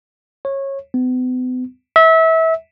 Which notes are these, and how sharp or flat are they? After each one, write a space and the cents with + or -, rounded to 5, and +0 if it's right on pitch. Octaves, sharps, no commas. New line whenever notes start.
C#5 -20
B3 +40
E5 -25